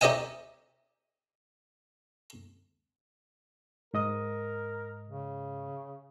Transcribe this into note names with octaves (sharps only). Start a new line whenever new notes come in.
D#4 G4 C#5 D#5 E5 G#5
G#2 A#4 D#5 D#6
C#3